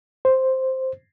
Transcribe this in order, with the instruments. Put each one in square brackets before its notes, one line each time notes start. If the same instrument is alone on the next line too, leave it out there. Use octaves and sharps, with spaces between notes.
[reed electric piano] C5